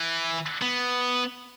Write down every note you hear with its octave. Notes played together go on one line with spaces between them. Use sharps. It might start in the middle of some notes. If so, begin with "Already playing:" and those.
Already playing: E3
B3